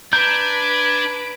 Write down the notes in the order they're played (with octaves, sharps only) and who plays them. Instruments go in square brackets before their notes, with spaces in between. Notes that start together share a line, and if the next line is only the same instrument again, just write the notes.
[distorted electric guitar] D4 [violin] B4 D7 [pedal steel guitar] A#5 G6 [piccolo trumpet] G#6